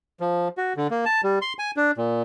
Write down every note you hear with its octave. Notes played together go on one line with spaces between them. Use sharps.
F3
F#4
D3
A#3
A5
G3
C6
G#5
D4
A#2